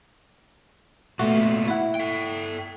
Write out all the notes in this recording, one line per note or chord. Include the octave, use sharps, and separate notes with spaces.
A#2 A3 B3 F#4
E4 F#5
A4 G5